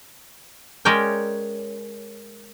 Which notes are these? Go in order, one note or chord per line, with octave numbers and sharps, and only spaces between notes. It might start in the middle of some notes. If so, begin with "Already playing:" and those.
G#3 C#4 A#4 C#5 D5 G5